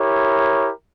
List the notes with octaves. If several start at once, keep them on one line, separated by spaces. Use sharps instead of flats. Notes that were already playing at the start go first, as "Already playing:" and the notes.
Already playing: E4 G4 A#4 C#5